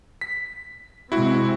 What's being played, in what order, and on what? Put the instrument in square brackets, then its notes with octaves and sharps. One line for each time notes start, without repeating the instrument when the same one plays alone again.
[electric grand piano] B6
[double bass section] C3 G#3 C4 [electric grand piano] E4 F#4